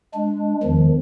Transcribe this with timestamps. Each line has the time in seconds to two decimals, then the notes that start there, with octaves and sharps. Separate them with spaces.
0.14 G#3 D4
0.63 E2 D#3 F3